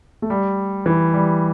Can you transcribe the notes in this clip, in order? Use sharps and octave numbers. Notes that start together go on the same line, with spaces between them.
A3
G3
E3
G3